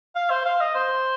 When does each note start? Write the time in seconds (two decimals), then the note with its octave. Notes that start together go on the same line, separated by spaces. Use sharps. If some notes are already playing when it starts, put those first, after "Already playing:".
0.15 F5
0.30 C5
0.45 F5
0.60 D#5
0.75 C5